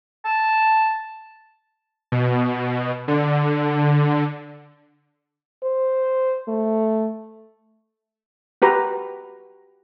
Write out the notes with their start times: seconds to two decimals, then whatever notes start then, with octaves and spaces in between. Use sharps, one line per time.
0.25 A5
2.12 B2
3.08 D3
5.63 C5
6.48 A3
8.62 F#4 G4 B4 A#5